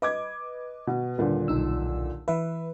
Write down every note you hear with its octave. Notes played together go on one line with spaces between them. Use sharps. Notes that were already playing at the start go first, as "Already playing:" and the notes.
B4 D#5 D6 G#6
B2
D#1 A#2 D3
B1 D#4 E6
E3 B4 E5